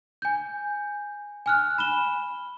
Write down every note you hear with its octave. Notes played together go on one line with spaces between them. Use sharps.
G#5 G6
G#5 F6 F#6
B5 E7 G7